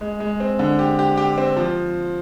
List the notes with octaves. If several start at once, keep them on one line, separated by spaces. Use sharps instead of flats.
G#3
G#3
C4
D3
G4
G4
G4
C4
F3